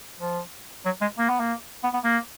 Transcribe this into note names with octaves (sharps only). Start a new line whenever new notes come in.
F3
F#3
G#3
A#3
B3
A#3
B3
B3
A#3